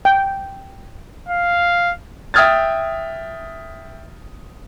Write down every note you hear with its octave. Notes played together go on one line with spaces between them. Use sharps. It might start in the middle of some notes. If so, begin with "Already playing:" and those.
G5
F5
E5 G5 D#6 F6 G#6 A6